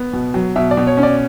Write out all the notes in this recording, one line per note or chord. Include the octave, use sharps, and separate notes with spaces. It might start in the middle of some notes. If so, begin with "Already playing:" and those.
Already playing: B3
B2
F#3
B2 E5
D5
B2
C#5
C#4
D5